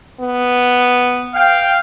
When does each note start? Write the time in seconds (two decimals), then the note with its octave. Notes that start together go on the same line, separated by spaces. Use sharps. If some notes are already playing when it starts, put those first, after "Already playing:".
0.20 B3
1.35 F5 G5